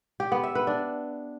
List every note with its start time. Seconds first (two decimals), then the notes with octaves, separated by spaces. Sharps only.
0.20 G4
0.32 B3
0.44 E5
0.55 B4
0.67 D4